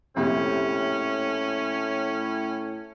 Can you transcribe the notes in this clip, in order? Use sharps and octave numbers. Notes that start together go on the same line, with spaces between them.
A#1 F2 A2 C3 C#4